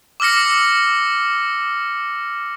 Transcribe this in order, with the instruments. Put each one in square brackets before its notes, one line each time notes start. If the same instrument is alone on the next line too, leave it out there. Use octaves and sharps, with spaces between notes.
[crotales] D6 E6 F6 A#6 C#7